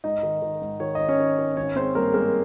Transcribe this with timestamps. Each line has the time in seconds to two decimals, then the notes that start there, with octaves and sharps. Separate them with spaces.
0.04 G#2 D#4 D#5
0.23 D#3
0.42 D#3
0.61 G#2
0.80 D#3 C#5
0.95 G#1 D#5
1.09 C#4 C#5
1.19 D#3
1.38 D#3
1.57 G#1 C#4 C#5
1.76 G#3 C4 C5
1.95 G2 A#3 A#4
2.14 G#3 A#3 A#4